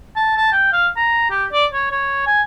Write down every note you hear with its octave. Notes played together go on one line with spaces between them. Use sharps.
A5
A5
G5
F5
A#5
G4
D5
C#5
C#5
G#5